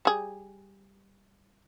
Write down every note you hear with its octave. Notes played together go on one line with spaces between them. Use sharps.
G3 G#4